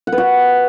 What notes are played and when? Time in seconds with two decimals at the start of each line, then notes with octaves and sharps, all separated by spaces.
0.07 F#5
0.12 B4
0.18 F#4